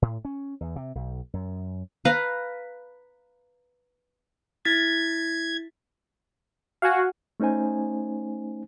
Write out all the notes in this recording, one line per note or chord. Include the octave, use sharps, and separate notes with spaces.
A2
C#4
E2
C3
B1
F#2
B4 F5 A#5
E4 G#6 A6 B6
F#4 F5 F#5 G#5
A3 C#4 D#4 C5 G#5